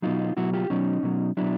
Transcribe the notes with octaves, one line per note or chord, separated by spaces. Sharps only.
B2 F#3 D#4 F4
B2 F#3 E4 F#4
F4 G4
B2 F#3 C#4 D#4
B2 F#3
B2 F#3 D4 E4